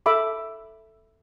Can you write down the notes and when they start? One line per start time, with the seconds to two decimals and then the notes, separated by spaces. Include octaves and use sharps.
0.06 A4 E5 B5 D6